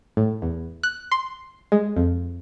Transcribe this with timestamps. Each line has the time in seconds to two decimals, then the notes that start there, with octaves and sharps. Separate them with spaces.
0.17 A2
0.42 E2
0.83 F#6
1.11 C6
1.72 G#3
1.96 F2